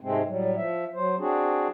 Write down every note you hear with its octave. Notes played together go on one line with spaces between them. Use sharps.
G#2 C3 G#3 A3 C4
A2 F#3 G3
F3 E5
F#3 C5
C4 D4 F#4 G#4